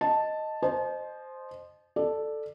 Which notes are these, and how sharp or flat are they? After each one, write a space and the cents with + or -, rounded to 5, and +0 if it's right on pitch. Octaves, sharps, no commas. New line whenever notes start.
D#5 +0 A5 +0
C5 +0 D#5 -25 A5 -40
A4 +0 D5 +15